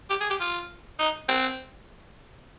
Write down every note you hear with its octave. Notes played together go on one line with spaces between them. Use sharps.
G4
G#4
G4
F4
D#4
C4